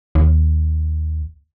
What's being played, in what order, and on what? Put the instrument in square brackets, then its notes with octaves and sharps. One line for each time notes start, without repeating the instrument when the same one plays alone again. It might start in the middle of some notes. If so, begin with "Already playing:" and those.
[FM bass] D#2